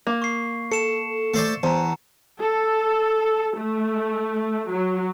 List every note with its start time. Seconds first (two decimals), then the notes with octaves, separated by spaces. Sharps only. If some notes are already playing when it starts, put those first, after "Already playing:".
0.07 A#3
0.22 C#6 C7
0.72 A4 C#7 E7
1.34 A3 C5 D5
1.63 E2 C5 A5 A#5
2.39 A4
3.57 A3
4.69 F#3